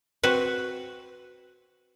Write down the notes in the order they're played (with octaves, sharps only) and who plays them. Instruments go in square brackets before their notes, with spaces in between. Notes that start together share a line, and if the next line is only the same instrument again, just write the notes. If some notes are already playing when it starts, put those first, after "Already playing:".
[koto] C4 F#4 B4